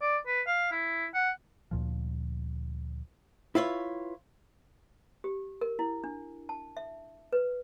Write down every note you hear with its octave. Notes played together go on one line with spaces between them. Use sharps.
D5
B4
F5
E4
F#5
D2 A#2 F3
E4 F4 B4 C#5
G4
A#4
E4
D4
A5
E5
B4